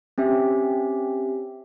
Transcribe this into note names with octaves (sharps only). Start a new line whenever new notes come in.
C4 C#4 G4 E5